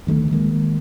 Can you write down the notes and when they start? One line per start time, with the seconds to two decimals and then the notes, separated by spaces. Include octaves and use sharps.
0.07 D2 D#3 G3 A3
0.31 D#3 G#3 A#3